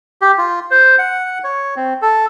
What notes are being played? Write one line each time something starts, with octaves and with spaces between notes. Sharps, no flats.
G4
F4
C5
F#5
C#5
C4
A4